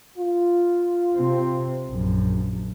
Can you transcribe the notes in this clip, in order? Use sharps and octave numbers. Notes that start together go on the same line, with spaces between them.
F4
C3 C4
A#1 F#2